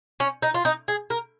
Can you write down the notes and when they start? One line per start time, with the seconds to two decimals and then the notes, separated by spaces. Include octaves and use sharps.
0.20 C#4
0.42 D#4
0.54 F4
0.65 D#4
0.88 G#4
1.10 A#4